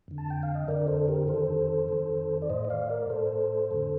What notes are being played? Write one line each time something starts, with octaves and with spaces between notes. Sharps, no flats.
F2 D3
A5
G5
F5
D#5
F2 D3 A#4 D5
A4 C5
G4 A#4
F2 D#3 A4 C5
F2 D#3
D5
A2 C5 D#5
D#5
D5 F5
A#4 D5
A2 A4 C5
F2 D3